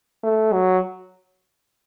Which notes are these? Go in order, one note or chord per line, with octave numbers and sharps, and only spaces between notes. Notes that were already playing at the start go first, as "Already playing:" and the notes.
A3
F#3